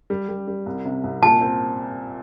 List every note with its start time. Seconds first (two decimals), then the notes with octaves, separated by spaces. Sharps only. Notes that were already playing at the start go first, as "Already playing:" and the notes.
0.10 G3
0.29 G3
0.47 G3
0.66 C2
0.85 C3
1.04 C2
1.22 A#2 A5
1.41 C4